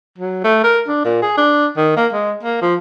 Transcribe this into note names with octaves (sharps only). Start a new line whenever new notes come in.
F#3
A3
A#4
D4
A#2
G#4
D4
D#3
A#3
G#3
A#3
F3